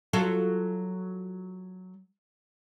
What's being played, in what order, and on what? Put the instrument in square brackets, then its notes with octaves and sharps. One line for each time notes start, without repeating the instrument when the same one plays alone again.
[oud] F#3 F4 A4